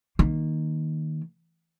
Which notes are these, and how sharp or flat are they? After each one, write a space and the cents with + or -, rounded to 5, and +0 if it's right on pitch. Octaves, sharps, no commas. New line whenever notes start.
D#3 +0 A#3 +0